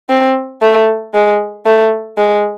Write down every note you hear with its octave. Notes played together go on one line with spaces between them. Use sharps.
C4
A3
G#3
A3
G#3